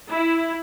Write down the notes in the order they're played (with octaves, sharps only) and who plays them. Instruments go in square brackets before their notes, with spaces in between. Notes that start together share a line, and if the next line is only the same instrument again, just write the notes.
[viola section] E4